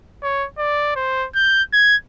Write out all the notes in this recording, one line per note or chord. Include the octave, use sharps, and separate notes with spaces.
C#5
D5
C5
G6
G#6